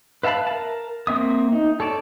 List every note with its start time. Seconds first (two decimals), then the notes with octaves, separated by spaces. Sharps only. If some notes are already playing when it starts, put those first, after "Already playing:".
0.23 B4 E5 F5 A5 B5
0.47 A#4 A5
1.07 A#3 C4 E5 D#6
1.52 D#4
1.80 A4 C#5 D5 A5